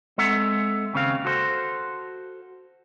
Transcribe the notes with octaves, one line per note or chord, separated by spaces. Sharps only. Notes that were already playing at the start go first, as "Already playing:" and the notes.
G#3 C4 A4 E5 F#5 A#5
D#2 C#3 C4 F5
F#4 A4 C5